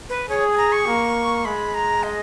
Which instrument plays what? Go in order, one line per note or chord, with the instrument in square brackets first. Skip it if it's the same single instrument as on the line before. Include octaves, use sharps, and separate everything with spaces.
[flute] B4
[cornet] G#4 [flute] C#5
[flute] G#5
A#5
C#6
[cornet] A#3
[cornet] G#3 [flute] B5
[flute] A#5
D#5